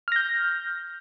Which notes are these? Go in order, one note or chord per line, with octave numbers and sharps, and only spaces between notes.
F6 G6 A#6